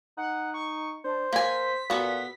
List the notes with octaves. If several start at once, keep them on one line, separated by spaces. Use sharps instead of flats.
D#4 F#5
C#6
D4 C5
A#3 G#5 B6
A#2 B3 F#4 A4